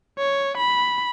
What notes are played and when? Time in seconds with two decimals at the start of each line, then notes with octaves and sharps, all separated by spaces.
0.19 C#5
0.57 B5